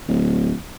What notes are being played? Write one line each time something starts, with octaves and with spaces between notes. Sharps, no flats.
D1